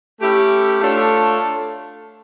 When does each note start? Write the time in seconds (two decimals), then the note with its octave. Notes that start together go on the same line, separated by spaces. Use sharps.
0.20 A3 C#4 E4 G4
0.80 A3 D4 F4 A4 C#5